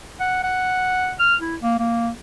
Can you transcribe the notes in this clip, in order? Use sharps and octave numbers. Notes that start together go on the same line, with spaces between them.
F#5
F#5
F6
E4
A#3
A#3